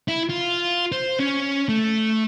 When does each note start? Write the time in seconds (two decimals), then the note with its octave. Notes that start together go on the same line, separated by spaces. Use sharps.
0.08 E4
0.29 F4
0.92 C5
1.19 C#4
1.69 A3